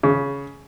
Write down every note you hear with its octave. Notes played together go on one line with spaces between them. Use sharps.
C#3